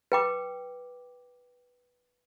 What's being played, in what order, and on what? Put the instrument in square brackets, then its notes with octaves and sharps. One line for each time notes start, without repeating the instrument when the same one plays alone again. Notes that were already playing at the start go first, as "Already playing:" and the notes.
[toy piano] B4 G5 D6